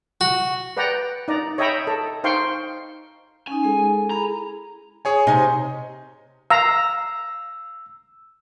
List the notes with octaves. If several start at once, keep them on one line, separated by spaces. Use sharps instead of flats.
F#4
B4 D5 F#5 G5 A#5
D#4 D5 A#5
C#5 D#5 E5 G5 A#5 B5
A4
D#4 C5 F5 G5 C6 C#6
C#4 D#4 G#5
G#3 G#4 A4
E4 G#4 A#5 B5
G#4 C#5 G#5
C3 D#4 D#5 G#5
F5 A#5 E6